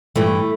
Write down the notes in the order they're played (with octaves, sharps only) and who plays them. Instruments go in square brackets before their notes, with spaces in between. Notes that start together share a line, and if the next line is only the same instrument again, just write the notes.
[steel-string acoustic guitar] G2 E3 A3